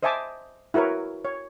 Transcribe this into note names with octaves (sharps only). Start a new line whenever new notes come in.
C5 D#5 E5 G#5 A5 D6
E4 F#4 A#4 B4 C#5
C#5